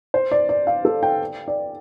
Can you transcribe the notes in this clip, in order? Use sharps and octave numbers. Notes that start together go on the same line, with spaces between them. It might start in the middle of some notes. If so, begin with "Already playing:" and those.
C5
D5
D5
F5
A4
G5
D5